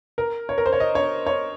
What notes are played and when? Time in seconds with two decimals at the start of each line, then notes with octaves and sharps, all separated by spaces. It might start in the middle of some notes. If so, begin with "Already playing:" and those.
0.18 A#4
0.49 C#5
0.58 A#4
0.66 C5
0.73 C#5
0.80 D#5
0.95 C#5
1.27 C#5